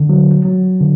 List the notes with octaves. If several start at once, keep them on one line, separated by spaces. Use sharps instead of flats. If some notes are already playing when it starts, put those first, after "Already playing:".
Already playing: D3
F#3
F#3
D3